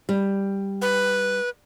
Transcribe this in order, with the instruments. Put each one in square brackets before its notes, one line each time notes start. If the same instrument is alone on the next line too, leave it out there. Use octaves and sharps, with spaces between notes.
[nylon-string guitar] G3
[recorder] B4